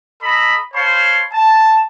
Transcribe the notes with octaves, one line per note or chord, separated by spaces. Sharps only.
A4 D#5 A#5 B5
C5 C#5 F5 A5 B5 C6
A5